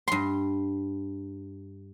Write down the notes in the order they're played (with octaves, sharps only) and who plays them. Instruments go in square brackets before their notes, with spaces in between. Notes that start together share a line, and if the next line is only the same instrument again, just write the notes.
[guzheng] G2 C6